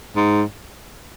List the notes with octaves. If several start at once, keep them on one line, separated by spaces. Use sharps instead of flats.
G#2